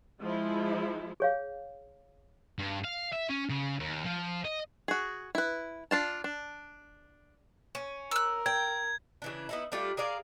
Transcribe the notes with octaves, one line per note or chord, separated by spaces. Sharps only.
F3 G#3 E4
G#4 C#5 F5
G2
F5
E5
C#4
C#3
D#2
F3
D#5
F#4 G#4
E4 B4
D4 F4 A5
D4
C#4
A#4 E6 F#6
G5 G#6
C#3 E3 D4
B3 D#4 E4
G3 A3 D4 F4
G#4 A#4 D5 F5